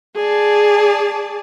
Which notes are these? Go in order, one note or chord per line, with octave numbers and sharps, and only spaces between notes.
G#4 D5 A5